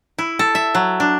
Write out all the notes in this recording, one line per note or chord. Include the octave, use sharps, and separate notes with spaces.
E4
A4
E5
F#3
D4